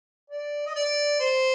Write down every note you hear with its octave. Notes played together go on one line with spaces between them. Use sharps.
D5
D#5
D5
C5